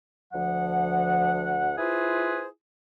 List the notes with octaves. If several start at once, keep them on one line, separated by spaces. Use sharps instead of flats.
D2 F3 F#5
E4 F4 G#4 B4 C5